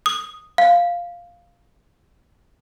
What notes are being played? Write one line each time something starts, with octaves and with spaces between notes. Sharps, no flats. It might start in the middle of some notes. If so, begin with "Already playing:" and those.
D#6
F5